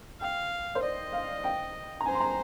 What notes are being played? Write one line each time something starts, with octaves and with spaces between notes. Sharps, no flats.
F5 G5
C5
D5 D#5
F5
G5
A#5
C5 G#5
C6
A#5